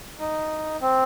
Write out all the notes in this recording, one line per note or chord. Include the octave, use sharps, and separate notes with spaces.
D#4
C4